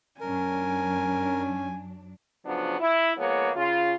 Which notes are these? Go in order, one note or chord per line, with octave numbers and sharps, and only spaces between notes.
F#2 F#3 C#4 D4 A#4 G#5
C#3 F3 F#3 B3 D4
E4
F3 G#3 A#3 B3 C#5
C#3 F4